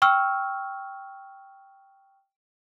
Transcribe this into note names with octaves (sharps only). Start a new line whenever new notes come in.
G5 C#6 E6 F6